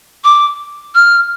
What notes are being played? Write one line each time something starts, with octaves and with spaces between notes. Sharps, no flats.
D6
F6